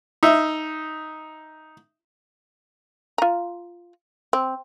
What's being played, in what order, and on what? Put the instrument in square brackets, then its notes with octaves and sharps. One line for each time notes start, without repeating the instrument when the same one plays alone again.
[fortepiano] D#4 E5
[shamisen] F4 A#5
C4